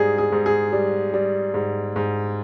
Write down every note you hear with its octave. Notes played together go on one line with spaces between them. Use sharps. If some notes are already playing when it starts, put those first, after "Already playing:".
Already playing: G#2 G3 G#4
G#4
G#2
G#4
G3
G3
G#2
G#2